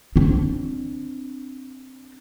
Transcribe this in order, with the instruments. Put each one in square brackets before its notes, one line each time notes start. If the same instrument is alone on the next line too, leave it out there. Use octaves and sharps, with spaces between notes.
[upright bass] C4 D4